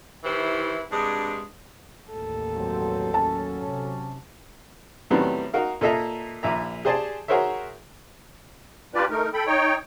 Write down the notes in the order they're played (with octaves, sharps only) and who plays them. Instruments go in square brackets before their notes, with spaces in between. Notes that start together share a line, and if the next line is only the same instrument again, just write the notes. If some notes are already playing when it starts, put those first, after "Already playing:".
[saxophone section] D#3 E3 E4 G4 C5
G2 C3 G#3 D4 G#4
[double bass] A1 D#2 [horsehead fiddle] A4
[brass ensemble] G2 F#3 C4
[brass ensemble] F#3 C#4 [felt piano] A5
[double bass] C3
[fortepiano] A2 D#3 F#3 G3 B3 C4
D#4 F#4 A#4 F5
A#2 A#3 A4 D#5 E5 A#5
A#1 A#2 E5 A#5
G4 G#4 C5 D5 G#5 A5
F#4 G#4 A#4 C5 C#5 E5
[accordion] G3 D4 F4 G4 B4 D5
A3 D#4 A#4
A4 G5 B5
D#4 C#5 G5